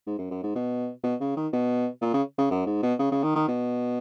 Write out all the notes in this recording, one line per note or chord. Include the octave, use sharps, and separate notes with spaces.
G#2
F#2
F#2
G#2
B2
B2
C#3
D#3
B2
A#2
C#3
C#3
F#2
G#2
B2
C#3
C#3
D#3
D#3
B2